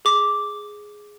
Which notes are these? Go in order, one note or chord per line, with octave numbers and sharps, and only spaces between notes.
G#4 D6